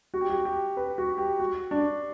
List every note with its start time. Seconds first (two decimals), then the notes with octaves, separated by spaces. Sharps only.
0.14 F#4
0.21 G4
0.30 F#4
0.45 G4
0.77 B4
0.98 F#4
1.18 G4
1.40 F#4
1.71 D4